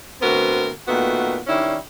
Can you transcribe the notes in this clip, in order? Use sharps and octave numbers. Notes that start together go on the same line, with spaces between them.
D2 B3 C4 F#4 A#4
A#2 D#3 A3 B3 F#4
D#3 G3 C#4 D4 E4